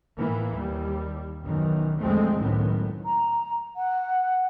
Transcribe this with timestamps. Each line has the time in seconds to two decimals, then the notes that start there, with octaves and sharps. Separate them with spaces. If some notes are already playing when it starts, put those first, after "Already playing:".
0.17 A2 E3 A#3
0.54 D#2 G3
1.43 B1 F#2 D#3 E3
1.98 F2 D3 G#3 A3 C4
2.38 C#2 F#2 A2 D#3 B3
3.06 A#5
3.76 F#5